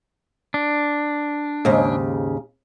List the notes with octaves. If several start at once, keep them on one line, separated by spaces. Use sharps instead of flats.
D4
D#2 G#2 C#3